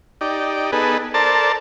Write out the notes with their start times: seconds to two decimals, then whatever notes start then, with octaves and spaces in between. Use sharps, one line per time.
0.21 D#4 G4 D5
0.72 B3 D#4 G#4 A4 B4
1.14 A4 A#4 C5 D5 A5